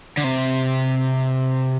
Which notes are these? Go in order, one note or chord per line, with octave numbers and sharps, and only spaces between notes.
D3
C3